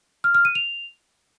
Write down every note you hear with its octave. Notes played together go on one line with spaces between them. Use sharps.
F6
F6
D#7
F7